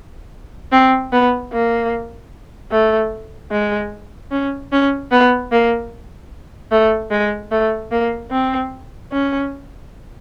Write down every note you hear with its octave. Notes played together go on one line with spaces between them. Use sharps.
C4
B3
A#3
A3
G#3
C#4
C#4
B3
A#3
A3
G#3
A3
A#3
C4
C#4